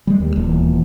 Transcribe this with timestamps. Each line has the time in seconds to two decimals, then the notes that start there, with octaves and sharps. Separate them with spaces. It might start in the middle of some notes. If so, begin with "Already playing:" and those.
0.07 G3 G#3
0.20 D#2 G3
0.36 D#1 E2 A#2